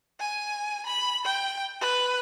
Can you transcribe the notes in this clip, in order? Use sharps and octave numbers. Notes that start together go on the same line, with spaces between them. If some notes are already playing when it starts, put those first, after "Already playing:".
G#5
B5
G5
B4